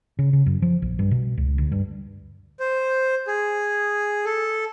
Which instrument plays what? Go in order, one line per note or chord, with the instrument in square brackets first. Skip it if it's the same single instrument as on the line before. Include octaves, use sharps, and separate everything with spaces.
[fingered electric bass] C#3
C#3
F#2
F3
A#1
G2
B2
C#2
D2
G2
[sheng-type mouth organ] C5
G#4
A4